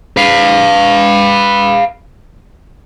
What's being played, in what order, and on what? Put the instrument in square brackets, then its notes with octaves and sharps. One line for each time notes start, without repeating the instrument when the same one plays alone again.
[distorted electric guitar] B4 F5